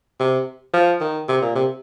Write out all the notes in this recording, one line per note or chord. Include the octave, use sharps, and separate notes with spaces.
C3
F3
D#3
C3
A#2
C3